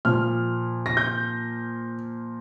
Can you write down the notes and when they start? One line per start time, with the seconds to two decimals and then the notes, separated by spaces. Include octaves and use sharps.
0.05 A#2 F3 F6
0.86 A#6
0.97 G6